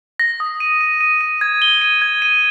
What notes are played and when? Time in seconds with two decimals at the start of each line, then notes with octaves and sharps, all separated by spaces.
0.20 A#6
0.40 D#6
0.60 D#7
0.81 D#7
1.01 D#7
1.21 D#7
1.41 G#6
1.62 G7
1.82 D#7
2.02 G#6
2.22 D#7